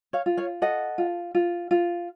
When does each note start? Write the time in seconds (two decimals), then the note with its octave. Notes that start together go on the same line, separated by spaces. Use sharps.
0.13 C#5 F5
0.26 F4
0.37 C#5 F5
0.62 A4 D#5 F#5
0.98 F4
1.35 F4
1.71 F4